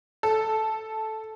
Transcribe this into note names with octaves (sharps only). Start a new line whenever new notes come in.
A4